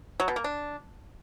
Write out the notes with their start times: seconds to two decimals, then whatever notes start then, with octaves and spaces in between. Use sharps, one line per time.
0.20 F#3
0.28 B2
0.36 A#3
0.44 D4